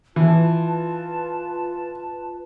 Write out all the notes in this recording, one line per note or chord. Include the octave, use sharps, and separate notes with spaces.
E3 F4 B4 A5